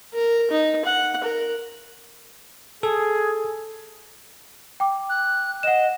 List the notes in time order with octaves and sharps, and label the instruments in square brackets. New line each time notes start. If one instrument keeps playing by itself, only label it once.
[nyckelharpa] A#4
D#4
F#5
A#4
[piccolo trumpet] G#4 [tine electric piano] A4
[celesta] G5 D6
[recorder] F#6
[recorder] D#5 [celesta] F#5 E7